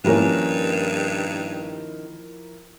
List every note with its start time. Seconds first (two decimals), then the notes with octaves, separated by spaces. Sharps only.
0.04 G2 D#3 F3 A#3 C#4 E4 A#4